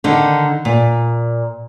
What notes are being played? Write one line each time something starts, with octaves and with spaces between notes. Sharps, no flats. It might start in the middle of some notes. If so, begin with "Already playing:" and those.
D3 D#3 D4
A#2